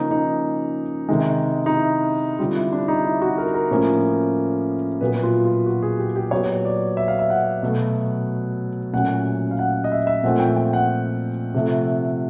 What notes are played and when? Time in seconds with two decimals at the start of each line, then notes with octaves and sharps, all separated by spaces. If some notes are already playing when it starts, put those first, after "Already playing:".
Already playing: C#3 F3 A#3 C#4 D#4
0.11 D#4
1.09 C3 D#3 G#3
1.66 D#4
1.74 E4
2.39 D3 G3 C4 F4
2.56 E4
2.73 D4
2.88 D#4
3.04 E4
3.22 F#4
3.38 A#4
3.54 A#4
3.71 A2 F3 A#3 C#4
5.01 A#2 F#3 B3 B4
5.23 F4
5.45 F4
5.66 F#4
5.82 G#4
6.00 G4
6.16 G4
6.31 A#2 F#3 B3 C#5
6.65 D5
6.97 E5
7.08 F5
7.19 E5
7.30 F#5
7.63 B2 F#3 A3
8.93 A#2 F#3 A3 C#4 F#5
9.51 F5
9.59 F#5
9.84 D#5
9.92 E5
10.07 E5
10.24 A#2 F3 A3 C4 F#5
10.40 G5
10.56 G5
10.73 F#5
11.54 C3 F3 A3